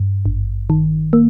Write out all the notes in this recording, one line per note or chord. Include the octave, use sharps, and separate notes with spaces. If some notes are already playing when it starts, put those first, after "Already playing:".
Already playing: G2
G#1
D#3
A#3